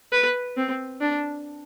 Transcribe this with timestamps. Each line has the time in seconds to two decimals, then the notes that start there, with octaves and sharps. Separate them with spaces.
0.12 B4
0.57 C4
1.01 D4